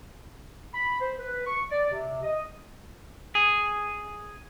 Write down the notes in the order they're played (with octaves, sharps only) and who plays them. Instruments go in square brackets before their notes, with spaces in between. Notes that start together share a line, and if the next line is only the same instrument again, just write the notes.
[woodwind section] B5
C5
B4
C#6
D5
C3
D#5
[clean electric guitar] G#4